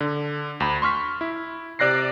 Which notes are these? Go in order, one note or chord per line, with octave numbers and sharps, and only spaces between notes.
D3
D2 B5
C6 C#6 F6 B6
E4
C3 D5 F#6 A#6 C7